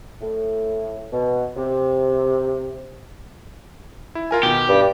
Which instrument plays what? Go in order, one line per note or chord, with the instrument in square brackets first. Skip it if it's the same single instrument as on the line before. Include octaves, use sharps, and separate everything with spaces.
[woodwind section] A2
B2
C3
[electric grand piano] E4
F4 A#4 G#5
[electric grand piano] B2 D#3 [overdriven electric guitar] G4
[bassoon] G2